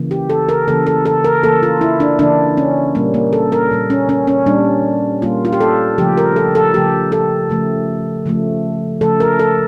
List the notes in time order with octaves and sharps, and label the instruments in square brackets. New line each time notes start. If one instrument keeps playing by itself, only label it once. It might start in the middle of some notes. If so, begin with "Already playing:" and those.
Already playing: [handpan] C#3 E3 A#3
G4
A4
A#4
C#3 E3 A#3 A4
A4
A4
A#4
C#3 E3 A#3 A4
F4
E4
D4
C#3 E3 A#3 D4
C#4
A#2 G3 A#3
A#3
A4
A#4
A#2 G3 A#3
C#4
C#4
C#4
A#2 G3 A#3 D4
A#2 G3 A#3 F4
F4
G4
A4
C#3 F3 A3 G4
A#4
A4
A4
C#3 F3 A3 G4
A4
C#3 F3 A3
C#3 F3 A3
C#3 F3 A3 A4
A#4
A4